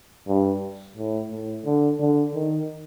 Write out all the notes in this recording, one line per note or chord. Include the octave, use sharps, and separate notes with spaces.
G2
A2
A2
D3
D3
D#3